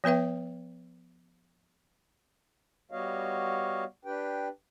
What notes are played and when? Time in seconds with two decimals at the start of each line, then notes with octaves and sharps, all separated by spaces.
0.04 F3 B3 B4 E5 G5
2.91 G3 B3 F#4 C#5 D#5 F5
4.05 D4 G4 B4 G5